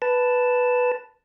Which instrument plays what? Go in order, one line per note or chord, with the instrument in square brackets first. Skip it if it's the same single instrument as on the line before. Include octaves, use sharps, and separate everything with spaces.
[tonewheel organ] B4 A5